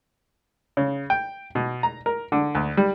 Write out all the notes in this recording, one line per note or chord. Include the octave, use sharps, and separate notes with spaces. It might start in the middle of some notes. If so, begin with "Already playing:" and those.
C#3
G5
B2
A#5
A#4
D3
D2
G3